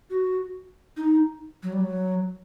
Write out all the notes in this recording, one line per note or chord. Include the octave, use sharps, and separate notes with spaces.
F#4
D#4
F#3
G3
F#3